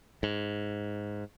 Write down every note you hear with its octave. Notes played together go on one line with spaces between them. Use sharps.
G#2